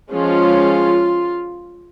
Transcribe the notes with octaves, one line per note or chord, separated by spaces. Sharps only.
F3 G#3 C#4 F4